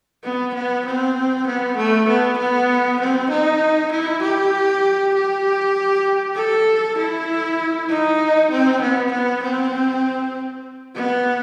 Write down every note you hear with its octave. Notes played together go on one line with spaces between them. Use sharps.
B3
B3
C4
B3
A3
B3
B3
C4
D#4
E4
G4
G4
A4
E4
D#4
C4
B3
B3
C4
B3